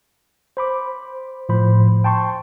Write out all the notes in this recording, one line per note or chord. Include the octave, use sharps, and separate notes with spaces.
C5 B5 D6
A2 F3 C5 B5
G5 A5 C6 C#6